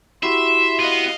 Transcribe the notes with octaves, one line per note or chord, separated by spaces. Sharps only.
E4 F#4 G4 E5 C6
B3 D#5 F5